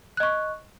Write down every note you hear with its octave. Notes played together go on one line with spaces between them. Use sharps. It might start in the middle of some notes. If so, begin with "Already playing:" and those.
D#5 C#6 F#6